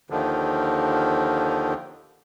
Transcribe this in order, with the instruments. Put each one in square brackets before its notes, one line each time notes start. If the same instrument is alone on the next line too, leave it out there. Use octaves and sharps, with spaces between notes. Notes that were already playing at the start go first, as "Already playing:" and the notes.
[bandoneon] D#2 D3 D#3 F3